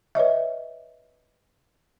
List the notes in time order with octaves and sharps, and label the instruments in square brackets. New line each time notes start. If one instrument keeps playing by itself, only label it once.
[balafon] B4 C#5 D#5 E5